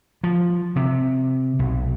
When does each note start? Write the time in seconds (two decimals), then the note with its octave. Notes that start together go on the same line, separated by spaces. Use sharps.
0.24 F3
0.76 C3
1.59 B1